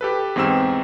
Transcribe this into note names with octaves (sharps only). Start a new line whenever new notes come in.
G4 A4 B4
E2 G#2 C4 G5 E6 E7